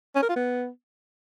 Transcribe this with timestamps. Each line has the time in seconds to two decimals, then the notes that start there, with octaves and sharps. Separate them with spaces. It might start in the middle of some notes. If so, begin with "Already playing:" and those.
0.16 C#4
0.22 A#4
0.29 F4
0.36 B3